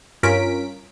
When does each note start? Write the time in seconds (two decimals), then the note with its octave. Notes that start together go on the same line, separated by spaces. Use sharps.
0.23 G2 C#4 F4 A#4 B6 D7